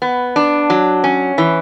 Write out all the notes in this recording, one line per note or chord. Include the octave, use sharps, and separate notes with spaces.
B3
D4
F#3
C#4
E3